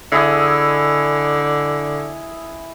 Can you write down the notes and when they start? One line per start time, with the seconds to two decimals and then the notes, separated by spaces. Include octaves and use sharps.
0.12 D3 E4 G#4 D#5